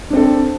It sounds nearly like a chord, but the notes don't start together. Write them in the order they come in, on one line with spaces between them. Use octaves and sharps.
D4 C4 A4